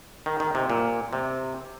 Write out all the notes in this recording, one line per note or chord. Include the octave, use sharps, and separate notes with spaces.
D#3
D#3
C3
A#2
C3